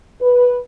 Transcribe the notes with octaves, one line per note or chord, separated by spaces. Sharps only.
B4